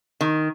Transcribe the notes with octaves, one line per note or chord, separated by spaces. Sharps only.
D#3